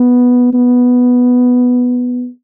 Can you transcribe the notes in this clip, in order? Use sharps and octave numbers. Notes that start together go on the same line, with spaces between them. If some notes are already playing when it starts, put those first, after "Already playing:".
Already playing: B3
B3